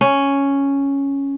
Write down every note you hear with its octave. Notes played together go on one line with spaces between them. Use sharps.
C#4